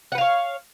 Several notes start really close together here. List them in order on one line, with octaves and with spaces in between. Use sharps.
F#5 B4 F5 C#5